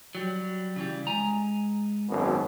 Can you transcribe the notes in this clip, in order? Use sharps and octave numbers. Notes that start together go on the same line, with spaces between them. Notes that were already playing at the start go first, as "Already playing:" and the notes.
F#3 G3
C#3 E3 G3
G#3 G#5 A#5
G#1 F#2 B2